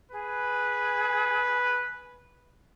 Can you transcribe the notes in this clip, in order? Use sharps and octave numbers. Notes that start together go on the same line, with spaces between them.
G#4 B4